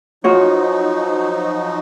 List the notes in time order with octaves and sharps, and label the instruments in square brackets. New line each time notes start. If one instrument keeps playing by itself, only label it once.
[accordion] F3 F#3 D#4 [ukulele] F4 F#4 C#5